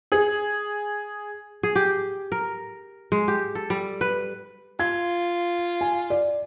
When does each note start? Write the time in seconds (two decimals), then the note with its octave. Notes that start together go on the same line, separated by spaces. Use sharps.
0.12 G#4
1.63 G#4
1.76 G4
2.32 A#4
3.12 G#3
3.28 G4
3.55 A4
3.70 G3
4.01 B4
4.79 F4 G#6
5.81 G#5
6.10 D5